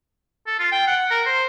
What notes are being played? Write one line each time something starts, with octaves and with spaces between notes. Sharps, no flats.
A4
F4
G5
F#5
A#4
C5